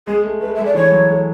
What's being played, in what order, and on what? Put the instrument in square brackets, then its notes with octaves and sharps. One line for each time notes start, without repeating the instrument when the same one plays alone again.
[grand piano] G#3 [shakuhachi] G#4
[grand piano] A3
[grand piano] A3 [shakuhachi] B4
[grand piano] G#3 [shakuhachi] E5
[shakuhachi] D5
[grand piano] E3 [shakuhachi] C#5
[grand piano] F#3
A3